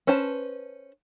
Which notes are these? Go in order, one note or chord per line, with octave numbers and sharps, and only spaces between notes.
C#4 B4 C5 A5